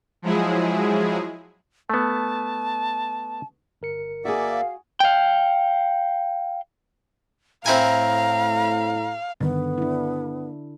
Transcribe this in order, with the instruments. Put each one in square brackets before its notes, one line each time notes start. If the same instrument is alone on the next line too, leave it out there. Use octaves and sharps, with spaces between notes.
[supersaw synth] F3 F#3 G#3 E4 G#4
[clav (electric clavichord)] A3 B3 [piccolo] A5
[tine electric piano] G1 A#4 C#7
[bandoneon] A#3 D5 E5 [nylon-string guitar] F#4 G#4
[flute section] F5
[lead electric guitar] F5 G5
[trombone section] A2 [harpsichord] C4 E4 G#5 [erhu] F5 [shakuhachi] A#5
[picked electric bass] G2 D#3 [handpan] D3 [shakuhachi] B3
[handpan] D4 E4